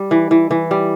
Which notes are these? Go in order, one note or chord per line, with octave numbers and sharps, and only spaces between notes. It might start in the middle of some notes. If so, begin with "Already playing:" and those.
Already playing: G3
E3
E3
E3
G3